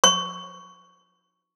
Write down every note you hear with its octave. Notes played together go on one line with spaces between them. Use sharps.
C#6